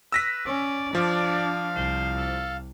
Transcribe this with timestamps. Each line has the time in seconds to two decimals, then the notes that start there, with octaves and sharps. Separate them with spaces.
0.12 B4 E6 A#6 B6
0.46 C#4 D5
0.95 F3 D4 F5
1.76 C2 C5
2.17 A4